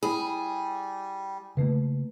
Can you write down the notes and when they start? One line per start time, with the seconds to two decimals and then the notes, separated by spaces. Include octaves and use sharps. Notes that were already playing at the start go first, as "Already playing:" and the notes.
0.03 G3 E4 G#4 B5
1.57 C#3 A3 A#3 B4